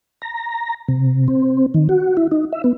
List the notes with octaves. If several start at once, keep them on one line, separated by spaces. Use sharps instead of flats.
A#5
C3
C4
D#3
F#4
E4
D#4
E5
B3